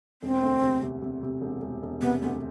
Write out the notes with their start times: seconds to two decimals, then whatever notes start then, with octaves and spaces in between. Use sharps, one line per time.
0.22 E1 C4
0.43 D2
0.63 C3
0.83 C3
1.02 C3
1.23 C3
1.42 E1
1.62 E1
1.83 E1
2.01 C3 B3
2.22 D2 B3